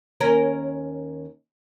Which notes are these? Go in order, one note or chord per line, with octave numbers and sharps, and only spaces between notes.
D#2 C#4 A#4